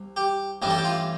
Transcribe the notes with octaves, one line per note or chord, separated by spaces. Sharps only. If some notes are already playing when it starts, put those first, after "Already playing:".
Already playing: C2
G4
A1 G2 E3 G3 G4
A4
G4
F4